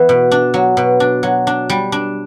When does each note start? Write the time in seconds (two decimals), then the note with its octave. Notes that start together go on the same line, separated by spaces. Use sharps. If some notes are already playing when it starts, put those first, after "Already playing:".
Already playing: E3 B3
0.09 B2
0.31 D4
0.54 F#3
0.77 B2
1.00 D4
1.23 F#3
1.47 D4
1.70 G3
1.92 D4